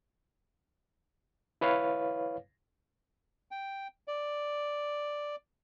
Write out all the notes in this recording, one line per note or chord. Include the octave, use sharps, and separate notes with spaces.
E4 B4 C#5 F5
G5
D5